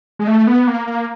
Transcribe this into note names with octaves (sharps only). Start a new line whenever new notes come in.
G#3
A3
B3
A#3
A#3